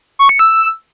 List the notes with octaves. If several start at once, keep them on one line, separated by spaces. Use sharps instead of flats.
C#6
C#7
E6